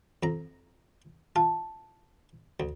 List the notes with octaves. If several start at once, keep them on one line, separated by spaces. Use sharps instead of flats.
F2 A#5
F4 A5
D2